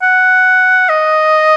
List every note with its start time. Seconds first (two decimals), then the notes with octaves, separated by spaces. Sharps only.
0.02 F#5
0.89 D#5